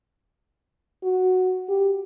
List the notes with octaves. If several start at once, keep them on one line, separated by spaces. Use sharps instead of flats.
F#4
G4